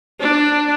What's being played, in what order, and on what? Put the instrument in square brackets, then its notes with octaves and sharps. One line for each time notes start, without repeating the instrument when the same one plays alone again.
[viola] D4